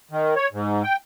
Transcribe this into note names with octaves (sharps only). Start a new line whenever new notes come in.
D#3
C#5
G#2
G5